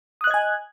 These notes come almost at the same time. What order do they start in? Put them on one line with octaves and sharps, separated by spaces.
D#6 F#6 D#5 G#6 G#5